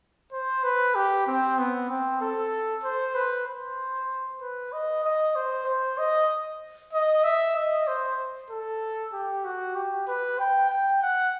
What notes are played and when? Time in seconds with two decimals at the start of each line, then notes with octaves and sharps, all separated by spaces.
0.32 C5
0.64 B4
0.95 G4
1.27 C4
1.58 B3
1.89 C4
2.21 A4
2.84 C5
3.15 B4
3.47 C5
4.41 B4
4.72 D#5
5.04 D#5
5.36 C5
5.66 C5
5.98 D#5
6.93 D#5
7.24 E5
7.56 D#5
7.87 C5
8.50 A4
9.13 G4
9.44 F#4
9.75 G4
10.08 B4
10.39 G5
10.70 G5
11.02 F#5